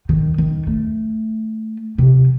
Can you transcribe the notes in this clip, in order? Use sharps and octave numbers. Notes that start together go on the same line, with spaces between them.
D#3
D#3
A3
C3